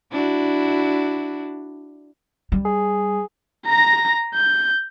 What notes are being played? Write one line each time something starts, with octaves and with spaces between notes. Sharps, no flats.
D4 E4 F#4
G3
G#4
A#5 A#6
G6